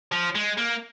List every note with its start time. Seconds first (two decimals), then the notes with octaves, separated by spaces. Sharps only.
0.12 F3
0.36 G#3
0.58 A#3